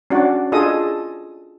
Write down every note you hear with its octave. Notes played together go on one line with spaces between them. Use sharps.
C#4 D4 F#4 D5 F#5
D4 F4 G#4 A4 D#5 D#6